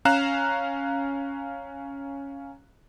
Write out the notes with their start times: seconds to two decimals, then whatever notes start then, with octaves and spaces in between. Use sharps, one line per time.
0.05 C#4 F5 A#5 F#6 E7